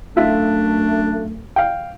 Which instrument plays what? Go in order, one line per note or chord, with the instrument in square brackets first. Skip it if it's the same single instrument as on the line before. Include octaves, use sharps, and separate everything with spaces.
[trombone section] F#2 A3 [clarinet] D4 [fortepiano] F4 E5
[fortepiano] F5 G5